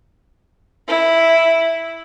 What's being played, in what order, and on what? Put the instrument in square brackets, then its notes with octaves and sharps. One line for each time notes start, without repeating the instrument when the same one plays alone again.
[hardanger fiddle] E4